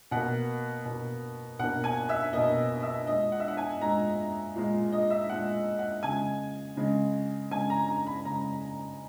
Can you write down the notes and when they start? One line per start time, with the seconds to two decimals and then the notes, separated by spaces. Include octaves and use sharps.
0.11 B2 A#3 F#5
0.85 B2 A#3
1.59 B2 A#3 F#5
1.84 G#5
2.09 E5
2.33 B2 A#3 D#5
2.83 E5
3.07 A#2 G#3 D#5
3.32 F#5
3.40 E5
3.48 F#5
3.57 G#5
3.81 A#2 G#3 A#5
4.55 A#2 G#3
4.92 D#5
5.10 E5
5.29 A#2 G#3 F#5
5.79 F#5
6.03 C#3 G#3 G#5
6.77 C#3 G#3
7.51 C#3 G#3 G#5
7.70 A#5
7.89 A#5
8.07 B5
8.25 C#3 G#3 A#5